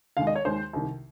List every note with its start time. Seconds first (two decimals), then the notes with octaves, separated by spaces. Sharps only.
0.17 D#2 D#3 G#3 F5
0.27 D#5
0.36 C#5
0.45 D#2 D#3 G#3 C5
0.73 C2 C3 D#3